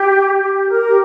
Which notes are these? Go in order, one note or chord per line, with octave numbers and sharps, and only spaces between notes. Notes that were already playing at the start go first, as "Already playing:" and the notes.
Already playing: G4
G4
A#4
G4